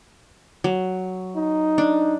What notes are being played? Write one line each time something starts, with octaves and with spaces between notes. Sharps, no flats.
F#3
D#4
D4